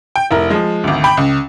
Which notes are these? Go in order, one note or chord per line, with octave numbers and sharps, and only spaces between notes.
G5
F1 E4 A#4
F3 G#3
G#1 D2
G5 B5
C#2